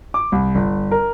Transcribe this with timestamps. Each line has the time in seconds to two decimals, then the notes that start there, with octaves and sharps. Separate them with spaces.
0.14 D6
0.32 C2
0.55 G1
0.91 A#4